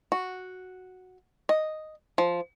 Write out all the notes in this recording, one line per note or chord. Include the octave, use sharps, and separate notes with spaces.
F#4
D#5
F3